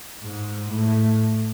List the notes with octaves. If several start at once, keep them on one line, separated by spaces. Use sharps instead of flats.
G#2
A2